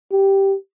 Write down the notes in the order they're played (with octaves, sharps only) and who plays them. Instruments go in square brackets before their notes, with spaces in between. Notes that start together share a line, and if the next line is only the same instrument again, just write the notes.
[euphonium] G4